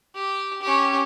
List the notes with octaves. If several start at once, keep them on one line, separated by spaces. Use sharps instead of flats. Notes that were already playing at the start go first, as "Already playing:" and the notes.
G4
C#4 G4